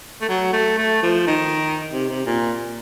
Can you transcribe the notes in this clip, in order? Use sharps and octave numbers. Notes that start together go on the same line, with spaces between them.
A3
F#3
A3
A3
F3
D#3
C3
C3
A#2